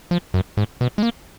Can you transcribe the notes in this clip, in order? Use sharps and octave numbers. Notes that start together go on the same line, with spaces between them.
F3
F#2
G#2
B2
G#3
A#3